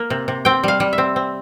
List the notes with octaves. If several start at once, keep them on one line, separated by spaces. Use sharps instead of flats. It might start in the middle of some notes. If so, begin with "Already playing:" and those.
Already playing: A#3
C3
C3
C4 G5
G3 F5
G3
E5
C4
C4